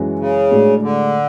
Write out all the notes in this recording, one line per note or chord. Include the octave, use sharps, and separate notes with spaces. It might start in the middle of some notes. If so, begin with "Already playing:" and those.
Already playing: F#2 E3 G#3 C#4 F#4
C#3
A2 G#3 D4 F#4
D3